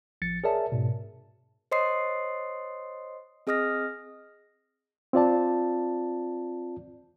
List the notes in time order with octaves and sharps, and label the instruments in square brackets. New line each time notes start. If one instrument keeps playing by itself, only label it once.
[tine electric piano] A1 F3 A6 C#7
G#4 A#4 C#5 D5 E5 A5
G#2 B2
[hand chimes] C5 C#5 D#5 C6 D#6 C7
C4 G#4 D#5 D#6 F6 A#6
[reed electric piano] C4 F4 D5 A5